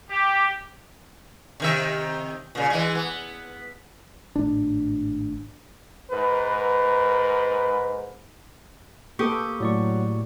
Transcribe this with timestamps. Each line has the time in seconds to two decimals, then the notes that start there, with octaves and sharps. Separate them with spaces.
0.10 G4
1.60 C3 D#3 E5
2.55 A#2 C#3
2.70 E3 G#3
2.95 B3
4.36 G#1 A2 D4
6.11 G#2 A#4 B4
9.19 A#3 G4 A4 B4 C#6 D#6
9.60 A2 F#3 D5 C#6